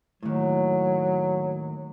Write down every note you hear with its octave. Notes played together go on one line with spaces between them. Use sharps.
D#2 A2 F#3